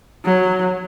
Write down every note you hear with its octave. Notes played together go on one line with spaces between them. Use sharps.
F#3